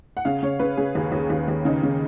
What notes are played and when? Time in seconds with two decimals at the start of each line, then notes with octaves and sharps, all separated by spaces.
0.17 F#5
0.25 C#3 F5
0.43 C#3 C#5
0.59 C#3 B4
0.77 C#3 G#4
0.95 D#2
1.12 D#2
1.30 D#2
1.48 D#2
1.65 C#3 D#4
1.83 C#3